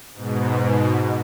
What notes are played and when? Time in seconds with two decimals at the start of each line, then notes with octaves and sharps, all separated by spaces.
0.14 G#2 B2